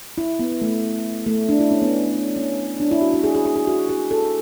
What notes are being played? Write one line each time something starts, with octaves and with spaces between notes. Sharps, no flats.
E4
B3
A3
A3
D4
E4
C#4
B3
C#4
D4
E4
F#4
F#4
G#4
G#4
G#4
G#4
F#4
G#4
A4